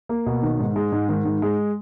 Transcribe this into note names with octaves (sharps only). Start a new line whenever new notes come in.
A#3
B2
D#3
G#2
G#3
G#2
D#3
G#2
G#3